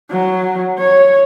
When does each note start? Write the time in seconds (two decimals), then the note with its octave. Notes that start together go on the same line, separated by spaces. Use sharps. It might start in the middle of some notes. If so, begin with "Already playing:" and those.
0.10 F#3
0.79 C#5